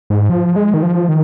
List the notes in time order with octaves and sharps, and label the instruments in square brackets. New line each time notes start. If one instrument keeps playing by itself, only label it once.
[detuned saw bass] G#2
F3
G#3
D#3
F3
D#3